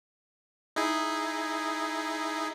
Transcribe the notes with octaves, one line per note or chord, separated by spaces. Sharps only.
D#4 E4 G#4